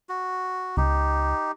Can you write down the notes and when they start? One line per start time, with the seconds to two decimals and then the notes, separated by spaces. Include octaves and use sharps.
0.09 F#4
0.77 C#2 D#4 G4